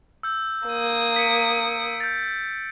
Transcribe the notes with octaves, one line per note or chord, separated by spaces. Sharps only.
E6 G6
A#3 D#6
B6 C#7 D7
G6 A6